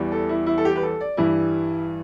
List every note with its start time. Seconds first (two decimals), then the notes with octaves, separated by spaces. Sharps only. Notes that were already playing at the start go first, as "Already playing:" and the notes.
Already playing: E2 E3 G3
0.12 A4
0.29 E4
0.46 E4
0.58 A4
0.65 G4
0.76 B4
0.83 A4
1.01 D5
1.17 G2 E3 G3 E4